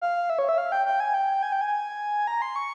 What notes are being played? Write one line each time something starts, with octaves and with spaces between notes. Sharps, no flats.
F5
E5
C#5
E5
F5
G5
G5
G#5
G5
G#5
G5
G#5
A#5
C6
C#6